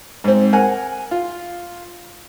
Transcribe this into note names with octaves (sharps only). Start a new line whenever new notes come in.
G#2 C4
A#4 F#5 G#5
F4